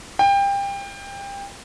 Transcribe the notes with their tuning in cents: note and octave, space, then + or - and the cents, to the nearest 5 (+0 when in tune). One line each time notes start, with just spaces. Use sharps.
G5 +25